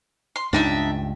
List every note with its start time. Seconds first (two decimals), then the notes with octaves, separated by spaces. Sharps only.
0.36 C6
0.53 C#2 G2 D4 D#4 E5